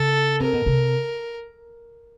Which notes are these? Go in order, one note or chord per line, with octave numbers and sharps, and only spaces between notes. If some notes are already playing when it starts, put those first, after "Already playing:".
Already playing: C#3 A4
C3 A#4
B2
C3